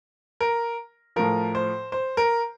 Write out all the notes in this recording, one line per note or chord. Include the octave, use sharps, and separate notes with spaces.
A#4
A2 F3 A#4
C5
C5
A#4